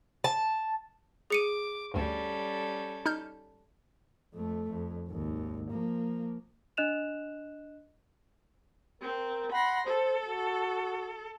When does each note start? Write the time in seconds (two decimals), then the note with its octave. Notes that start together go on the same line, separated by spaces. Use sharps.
0.24 A5
1.30 G#4 D6 C#7 D#7
1.94 D2 G2 G3 C#4 A4
3.06 D#4 F6 G6
4.34 F2 A3
4.69 F2
5.08 G#1 D#2
5.71 F3 A#3
6.77 D4 D#5 F#6 E7 F7
9.02 C4 A#4
9.52 F#5 B5 C6 A#6
9.87 A4 C5
10.29 F#4